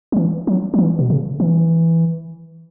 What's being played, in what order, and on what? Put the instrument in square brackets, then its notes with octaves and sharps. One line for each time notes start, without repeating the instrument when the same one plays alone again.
[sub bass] F#3
E3
F#3
F#3
E3
B2
C#3
E3